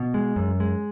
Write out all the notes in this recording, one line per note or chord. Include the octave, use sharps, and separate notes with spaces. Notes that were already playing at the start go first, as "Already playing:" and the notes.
Already playing: B2
G#3
F#2
G#3